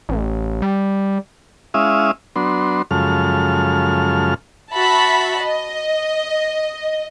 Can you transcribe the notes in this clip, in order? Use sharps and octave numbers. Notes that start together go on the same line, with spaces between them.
A1
G3
G#3 C#4 E4 E5 F5 D#6
F#3 B3 D4 C6
F#2 C#3 F3 G#3 A4 F6
F#4 E5 A5 B5
D#5